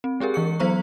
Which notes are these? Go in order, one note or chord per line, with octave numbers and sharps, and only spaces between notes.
C4
G#3 G4 G#4 A#4
E3 C#6 C#7
F#3 B3 C5 A#5 C#6